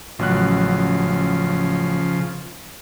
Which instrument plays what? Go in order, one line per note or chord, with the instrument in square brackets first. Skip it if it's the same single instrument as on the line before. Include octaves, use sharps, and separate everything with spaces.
[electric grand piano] A1 F#3 F#6 [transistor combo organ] C#3 F3